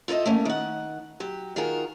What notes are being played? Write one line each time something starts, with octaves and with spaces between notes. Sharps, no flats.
F4 A4 A#4 D#5 E5
A3 A#3 C#4
D#3 F#5
F#3 G4
D#3 F4 F#4 G#4 A#4